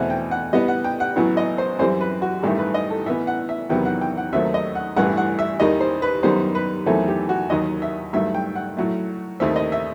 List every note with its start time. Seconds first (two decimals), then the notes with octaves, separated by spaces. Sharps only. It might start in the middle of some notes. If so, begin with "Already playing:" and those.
Already playing: E2 B2 A3 C4 F#5
0.10 G5
0.31 F#5
0.53 A2 G3 B3 D#5
0.68 F#5
0.84 G5
1.00 F#5
1.16 A1 A2 F#3 B3
1.37 D#5
1.58 C5
1.79 F#2 E3 G3 C4 C5
2.01 B4
2.22 F#4
2.43 A1 G2 D#3 A3 G4
2.59 B4
2.74 D#5
2.90 A4
3.06 A2 E3 B3 E5
3.27 F#5
3.49 E5
3.69 E2 C3 D#3 F#3 B3 G5
3.85 F#5
4.01 G5
4.17 F#5
4.33 D#2 D#3 F#3 A3 C4 E5
4.54 D#5
4.75 F#5
4.96 A1 G2 E3 A3 F#5
5.17 F#5
5.39 E5
5.60 D#2 D#3 G3 D#5
5.81 C5
6.02 B4
6.23 F#2 D#3 G3 B3 C5
6.55 B4
6.86 E2 D#3 F#3 A3 C4 A4
7.08 G4
7.29 F#4
7.50 D#2 D#3 F#3 D#5
7.82 E5
8.13 G2 D#3 F#3 A3 E5
8.34 G5
8.55 F#5
8.77 A2 F#3 A3
9.40 D#2 D#3 A3 C4 E5
9.56 D#5
9.72 E5